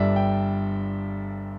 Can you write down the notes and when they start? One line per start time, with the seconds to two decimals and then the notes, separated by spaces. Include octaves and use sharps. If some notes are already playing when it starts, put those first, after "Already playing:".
Already playing: G1 G2 G3 D4 E5
0.16 G5